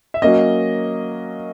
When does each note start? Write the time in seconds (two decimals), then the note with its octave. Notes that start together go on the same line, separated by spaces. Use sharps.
0.14 E5
0.22 F#3 A#3 C#4 D#5